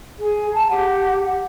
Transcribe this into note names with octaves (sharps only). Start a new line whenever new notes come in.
G#4
A5 A#5
G4 F#5